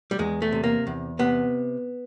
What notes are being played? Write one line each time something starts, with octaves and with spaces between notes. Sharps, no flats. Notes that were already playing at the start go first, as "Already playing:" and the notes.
G3
E2 G#3
A3
C3
A#3
E2
C3 B3